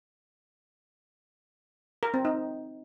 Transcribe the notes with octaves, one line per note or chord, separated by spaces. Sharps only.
A#4
C4
D#4